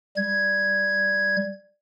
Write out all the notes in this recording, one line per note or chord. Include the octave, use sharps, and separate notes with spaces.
G3 G#6